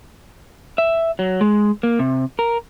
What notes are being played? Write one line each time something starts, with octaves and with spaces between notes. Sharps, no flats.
E5
F#3
G#3
A#3
C3
A#4